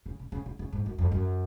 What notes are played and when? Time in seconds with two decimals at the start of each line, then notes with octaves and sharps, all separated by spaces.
0.06 C#3
0.19 C#3
0.32 C#3
0.46 C#3
0.59 C#3
0.72 G#2
0.86 F#2
0.98 F2
1.12 F#2